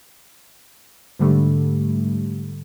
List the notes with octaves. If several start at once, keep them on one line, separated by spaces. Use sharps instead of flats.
G#2 D3 G3 A3